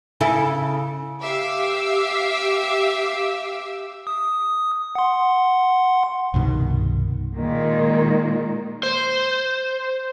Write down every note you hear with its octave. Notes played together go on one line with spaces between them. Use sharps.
C#3 E4 A4
G4 E5 F5 D6 E6
D#6
F#5 C6
C2 G2 B2 D#3
A#2 D#3 G#3
C5